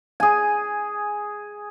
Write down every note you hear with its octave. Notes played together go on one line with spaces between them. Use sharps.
G#4 G#5